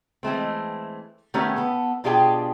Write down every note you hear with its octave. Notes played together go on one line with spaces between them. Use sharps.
E3 G#3 A3 C4
D#3 A3 B3 C#4 G4 C#5
B3 A4
B2 D4 F4 G4 G#4 G5